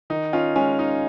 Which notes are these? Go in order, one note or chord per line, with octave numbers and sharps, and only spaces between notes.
D#3 D#4
C#4 F4
G#3 C#4
D#4